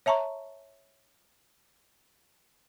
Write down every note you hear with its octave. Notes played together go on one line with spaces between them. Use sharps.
C#5 E5 A5 A#5 C#6